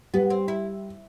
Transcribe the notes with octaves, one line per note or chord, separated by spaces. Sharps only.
G3 B3
C4
E4